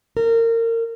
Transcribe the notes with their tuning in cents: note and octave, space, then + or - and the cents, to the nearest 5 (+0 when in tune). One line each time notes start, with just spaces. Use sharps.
A#4 -25